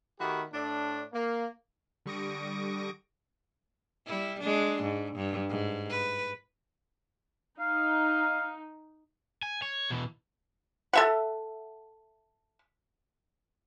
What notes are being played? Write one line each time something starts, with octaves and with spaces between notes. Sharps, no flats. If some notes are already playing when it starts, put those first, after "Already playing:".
D#3 A3 F#4 G4 B5
A2 D4
A#3
D3 G3 C#6 D#6 A#6 D7
G3 E4
G#3 D4
G#2
G2
G#2
B4
D#4 F5
G#5
C#5
B2 E3
A4 E5 F#5